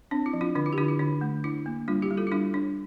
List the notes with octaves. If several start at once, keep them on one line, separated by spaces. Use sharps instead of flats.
C4 D4
E4
F3
D4 F4
D3 D4 F4
E4
G4
D3 D4 F4
E4
D3 D4
A3
D4 E4
A#3
G3 D4 F4
E4 G4
G3
F4 A4
E4
G3 D4 F4
D4